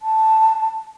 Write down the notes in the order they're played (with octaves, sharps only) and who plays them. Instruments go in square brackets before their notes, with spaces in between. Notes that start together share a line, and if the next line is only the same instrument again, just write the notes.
[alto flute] A5